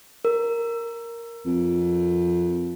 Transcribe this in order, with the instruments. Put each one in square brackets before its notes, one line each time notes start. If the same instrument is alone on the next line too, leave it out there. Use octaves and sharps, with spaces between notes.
[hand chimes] A#4
[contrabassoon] F2